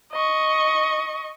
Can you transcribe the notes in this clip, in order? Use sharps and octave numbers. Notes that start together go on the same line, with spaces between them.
D#5 C#6